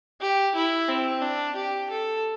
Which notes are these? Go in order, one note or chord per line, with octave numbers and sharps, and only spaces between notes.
G4
E4
C4
D4
G4
A4